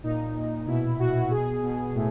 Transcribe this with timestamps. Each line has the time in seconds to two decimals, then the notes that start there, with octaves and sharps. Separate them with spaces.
0.03 A#2 D#4
0.35 A#2
0.67 B2 E4
0.99 B2 F#4
1.31 B2 G#4
1.63 B2
1.95 A2